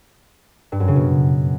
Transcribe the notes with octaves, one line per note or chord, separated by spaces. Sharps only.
G2
F#2
C#3
B2